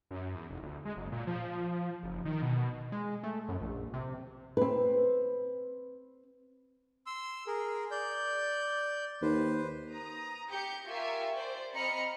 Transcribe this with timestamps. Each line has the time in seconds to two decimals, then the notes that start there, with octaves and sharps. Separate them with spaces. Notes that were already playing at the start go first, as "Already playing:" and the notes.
0.11 F#2
0.35 E2
0.50 F1
0.63 D2
0.85 G#3
0.97 F#1
1.12 A#2
1.27 F3
2.03 F#1
2.25 D#3
2.42 B2
2.92 G#3
3.23 A3
3.49 F#2
3.61 A#1
3.94 C3
4.57 C4 B4
7.06 C6 E6
7.47 G#4 A#4
7.91 D5 G6
9.22 D#2 B4 C5
9.93 A#5 D#6
10.49 G4 G6 C#7
10.86 F4 G4 A#4 E5 G#5 C#6
11.35 C5 D5
11.73 C4 D#5 A#5 B5 F6 C#7